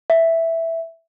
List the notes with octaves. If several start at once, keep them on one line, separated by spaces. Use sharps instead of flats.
E5